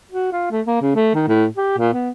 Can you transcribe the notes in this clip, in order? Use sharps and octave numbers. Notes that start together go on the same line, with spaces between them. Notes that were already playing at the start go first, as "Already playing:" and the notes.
F#4
F4
A3
A#3
C#3
A3
D#3
A2
G4
A#2
B3